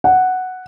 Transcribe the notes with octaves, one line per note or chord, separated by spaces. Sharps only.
F#5